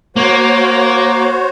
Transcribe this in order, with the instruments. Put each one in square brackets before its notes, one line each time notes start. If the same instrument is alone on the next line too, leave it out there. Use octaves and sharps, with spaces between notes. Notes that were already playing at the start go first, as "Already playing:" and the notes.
[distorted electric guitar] A#3 [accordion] F#4 C5 C#5